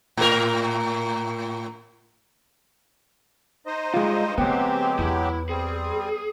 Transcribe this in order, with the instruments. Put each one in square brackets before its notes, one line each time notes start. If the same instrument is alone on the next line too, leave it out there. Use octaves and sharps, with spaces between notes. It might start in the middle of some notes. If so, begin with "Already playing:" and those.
[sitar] A2 A#4
[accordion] D#4 C5 D#5
[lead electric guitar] G2 [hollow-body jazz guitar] G#3 F4
[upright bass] D3 A3 [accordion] F#3 G#3 G4 [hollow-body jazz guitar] B3 [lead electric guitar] C4 G5
[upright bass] E2 [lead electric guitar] E4
[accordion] G3 C4 [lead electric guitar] G#4